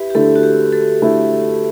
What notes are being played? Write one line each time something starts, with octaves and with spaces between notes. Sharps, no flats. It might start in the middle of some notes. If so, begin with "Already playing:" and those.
Already playing: E4 G4 B4
G4
D3 A3 E4 A4
F#4
G4
A4
D3 A3 E4